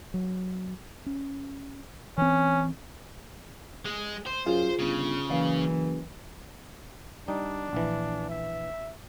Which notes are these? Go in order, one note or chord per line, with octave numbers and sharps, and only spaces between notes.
F#3
C#4
E3 C4 C#4
G#3
C5
F#2 F4 G#4 F5
G1 C#3
F#1 E3 D5 F5
G3 D4 D#4
A#1 E3
E5